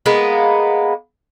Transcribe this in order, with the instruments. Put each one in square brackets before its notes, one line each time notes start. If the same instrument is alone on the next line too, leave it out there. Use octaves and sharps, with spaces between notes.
[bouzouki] G#3 A#3 B3